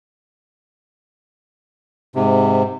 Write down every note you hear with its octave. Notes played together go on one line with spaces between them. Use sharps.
G#2 C3